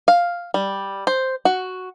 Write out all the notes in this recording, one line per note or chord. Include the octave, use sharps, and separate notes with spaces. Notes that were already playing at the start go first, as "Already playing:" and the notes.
F5
G3
C5
F#4